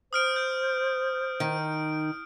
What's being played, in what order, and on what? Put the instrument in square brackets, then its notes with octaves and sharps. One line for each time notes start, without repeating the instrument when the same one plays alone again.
[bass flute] C5 [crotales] D#6 F6 D7
[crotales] F6 G6 D7
[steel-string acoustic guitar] D#3 [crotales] D7